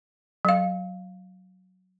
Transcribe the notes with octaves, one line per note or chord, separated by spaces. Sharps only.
F#3 F5